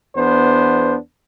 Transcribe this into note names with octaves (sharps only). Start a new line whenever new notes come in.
E2 B3 D4 C5